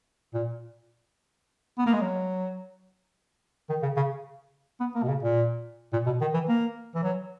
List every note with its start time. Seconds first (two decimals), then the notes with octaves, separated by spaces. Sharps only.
0.34 A#2
1.78 B3
1.86 A#3
1.93 G#3
2.02 F#3
3.70 D#3
3.83 C#3
3.97 C#3
4.80 B3
4.95 A#3
5.03 B2
5.09 C#3
5.23 A#2
5.93 A#2
6.06 B2
6.21 D#3
6.34 E3
6.49 A#3
6.95 E3
7.04 F#3